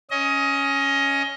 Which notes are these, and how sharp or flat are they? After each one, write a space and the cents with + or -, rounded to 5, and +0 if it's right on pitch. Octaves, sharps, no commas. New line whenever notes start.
C#4 +5 D#5 +20